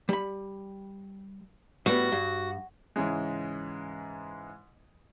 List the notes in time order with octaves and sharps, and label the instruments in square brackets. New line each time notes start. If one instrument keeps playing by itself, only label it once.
[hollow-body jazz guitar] G3 B5
[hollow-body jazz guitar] A2 G3 B3 [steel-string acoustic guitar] F#4
[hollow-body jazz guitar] G2
[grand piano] G#2 C#3 E3 G#3